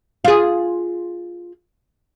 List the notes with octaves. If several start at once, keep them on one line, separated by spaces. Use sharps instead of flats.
F4 G#4